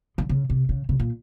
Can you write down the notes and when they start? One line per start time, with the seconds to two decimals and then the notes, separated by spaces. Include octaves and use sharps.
0.18 D3
0.29 C#3
0.50 C3
0.69 C#3
0.89 C#3
1.00 A#2